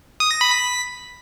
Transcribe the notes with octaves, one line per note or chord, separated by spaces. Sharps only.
D#6
A#6
B5
B6